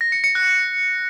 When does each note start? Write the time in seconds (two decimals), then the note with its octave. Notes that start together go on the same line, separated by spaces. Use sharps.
0.01 A#6
0.12 C#7
0.24 C#7
0.35 F#6